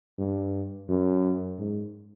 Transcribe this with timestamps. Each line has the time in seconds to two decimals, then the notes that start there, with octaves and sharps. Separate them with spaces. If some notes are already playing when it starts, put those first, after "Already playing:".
0.18 G2
0.89 F#2
1.59 G#2